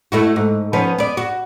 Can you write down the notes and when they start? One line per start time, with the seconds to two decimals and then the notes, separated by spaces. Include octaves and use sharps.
0.12 A3 E4 F#4
0.36 G#2
0.73 F3 B3 C#4
0.98 B3 D5
1.17 F#4